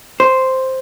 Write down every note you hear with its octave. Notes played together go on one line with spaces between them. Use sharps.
C5